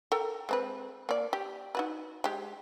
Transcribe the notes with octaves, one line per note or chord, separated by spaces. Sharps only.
A4 A#4 G5
G#3 C4 B4
A#3 D5
G4
D#4 F#4 B4
G#3 G4